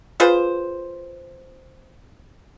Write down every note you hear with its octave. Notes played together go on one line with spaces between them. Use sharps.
F4 G#4 B4 C5